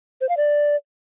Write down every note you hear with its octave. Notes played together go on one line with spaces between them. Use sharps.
C5
F5
D5